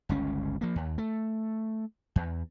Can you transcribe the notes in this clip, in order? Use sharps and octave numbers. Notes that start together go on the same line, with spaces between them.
G1 C#2 C#4
F3 A#3
D#2
A3
E2